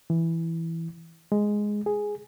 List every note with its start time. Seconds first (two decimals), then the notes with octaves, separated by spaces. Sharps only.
0.10 E3
1.32 G#3
1.86 G#4